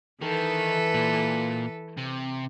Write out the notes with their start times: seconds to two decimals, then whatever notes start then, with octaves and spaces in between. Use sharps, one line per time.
0.22 D#3 E3 A4 B4
0.94 A#2
1.98 C3